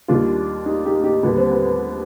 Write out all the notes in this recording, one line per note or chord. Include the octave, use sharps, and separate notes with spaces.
D#2 D#3 G3 D4 F4
D#4 G4
D#4 G4
D#4 G4
D#2 D3 G3 B3
C4
B3
B3